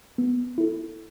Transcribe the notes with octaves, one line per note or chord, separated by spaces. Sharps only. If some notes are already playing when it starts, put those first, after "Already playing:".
B3
E4 A4